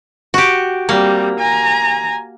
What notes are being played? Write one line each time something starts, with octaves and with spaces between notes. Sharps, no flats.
F#4 G4
G3 A#3 C4
G#5 A#5